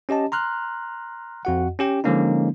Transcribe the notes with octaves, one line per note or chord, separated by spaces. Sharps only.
C#4 G4 D#5 A5
A#5 C6 F6 F#6
F2 F#4 F#5
C#4 G4 G5
D3 F3 G#3 A#3 C#4 D#4